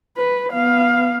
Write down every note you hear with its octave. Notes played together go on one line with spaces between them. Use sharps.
B4
B3 F5